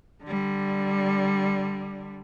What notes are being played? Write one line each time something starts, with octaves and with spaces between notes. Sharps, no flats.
D3 G3